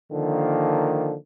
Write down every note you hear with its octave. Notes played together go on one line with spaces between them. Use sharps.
D3 D#3 F3 A#3